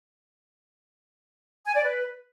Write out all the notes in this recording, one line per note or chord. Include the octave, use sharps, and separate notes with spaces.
G#5
D5
B4